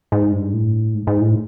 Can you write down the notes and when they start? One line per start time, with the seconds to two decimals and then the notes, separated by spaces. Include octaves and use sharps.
0.12 G#2
0.32 G2
0.53 A2
0.94 G#2
1.07 G#2
1.21 A2